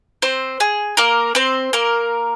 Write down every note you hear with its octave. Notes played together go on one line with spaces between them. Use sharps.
C4 C5
G#4
A#3 A#4
C4 C5
A#3 A#4